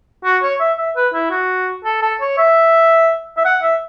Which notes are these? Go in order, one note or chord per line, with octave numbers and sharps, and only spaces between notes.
F#4
C#5
E5
E5
B4
E4
F#4
A4
A4
C#5
E5
E5
F#5
E5